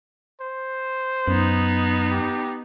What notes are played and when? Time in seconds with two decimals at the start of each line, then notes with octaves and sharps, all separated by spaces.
0.41 C5
1.28 F#2 B3 D#4
2.10 G4